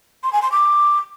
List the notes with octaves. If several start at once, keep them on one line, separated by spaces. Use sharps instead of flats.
C6
G#5
C6
D6